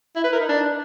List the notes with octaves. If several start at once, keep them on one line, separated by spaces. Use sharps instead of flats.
E4
B4
A#4
D#4
D4